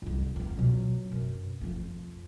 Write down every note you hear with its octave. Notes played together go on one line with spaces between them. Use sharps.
C2 F2
F2 B3
B2 F#3
F#2
F2 F3